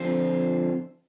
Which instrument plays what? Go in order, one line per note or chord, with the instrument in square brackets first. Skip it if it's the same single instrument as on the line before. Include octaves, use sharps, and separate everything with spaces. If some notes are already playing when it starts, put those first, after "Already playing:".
Already playing: [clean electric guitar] D3 F3 C4 F4 C5